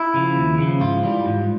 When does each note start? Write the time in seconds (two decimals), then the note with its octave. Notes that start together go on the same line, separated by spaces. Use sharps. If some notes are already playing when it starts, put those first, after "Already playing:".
Already playing: E4
0.14 C#3 F3
0.36 D#2
0.58 C#3 F3
0.80 G#2 F4
1.03 E3 G3
1.26 G#2